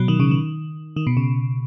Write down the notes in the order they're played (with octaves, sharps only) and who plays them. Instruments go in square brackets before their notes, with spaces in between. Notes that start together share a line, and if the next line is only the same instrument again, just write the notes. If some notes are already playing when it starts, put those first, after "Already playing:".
Already playing: [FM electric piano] B2 F#3
D#3
C#3
D#3
D#3
B2
C#3